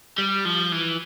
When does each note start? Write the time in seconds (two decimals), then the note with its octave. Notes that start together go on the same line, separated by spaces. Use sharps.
0.18 G3
0.45 F3
0.72 E3